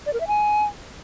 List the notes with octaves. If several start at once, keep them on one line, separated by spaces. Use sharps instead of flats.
D5
A#4
E5
G#5